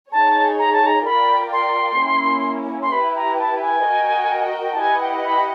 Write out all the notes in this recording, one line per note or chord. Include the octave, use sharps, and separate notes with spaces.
D#4 G#4 C#5 A5
A#5
A5
A#5
F4 A#4 D5 G5 B5
C6
A#3 C#4 E4
C6
E4 G4 B4 B5
A#5
A5
G#5
F#4 A#4 D#5 G5
A5
E4 G4 B4 D#5 F#5 G#5
G5
B5